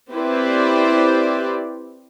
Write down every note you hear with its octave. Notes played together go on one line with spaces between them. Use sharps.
C4 E4 G4 B4 C5 D5